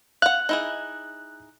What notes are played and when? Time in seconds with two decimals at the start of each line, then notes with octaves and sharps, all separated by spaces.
0.22 F5 F#5 F#6
0.49 D#4 E4 G#4